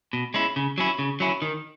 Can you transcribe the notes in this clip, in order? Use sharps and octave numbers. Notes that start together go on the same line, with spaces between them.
B2
G#3 C#4 E4
C#3
F#3 C#4 E4
C#3
F#3 C#4 E4
D#3